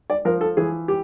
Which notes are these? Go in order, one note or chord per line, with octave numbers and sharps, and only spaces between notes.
D5
F3 A#4
A4
E3 G#4
G4